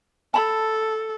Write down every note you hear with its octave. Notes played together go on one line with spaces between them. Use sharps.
A4 A5 B5